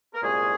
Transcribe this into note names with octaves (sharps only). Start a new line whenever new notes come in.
A#4
C2 A#2 G#3 C#4 G#4